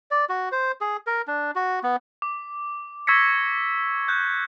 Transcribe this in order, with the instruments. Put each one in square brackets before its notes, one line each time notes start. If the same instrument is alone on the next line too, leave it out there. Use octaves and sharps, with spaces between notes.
[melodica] D5
F#4
C5
G#4
A#4
D4
F#4
B3
[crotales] D6
C#6 E6 G#6 A#6 B6 C#7
F#6 G6